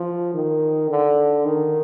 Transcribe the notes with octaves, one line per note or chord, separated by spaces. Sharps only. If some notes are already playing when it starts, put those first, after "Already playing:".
Already playing: F3
D#3
D3
D#3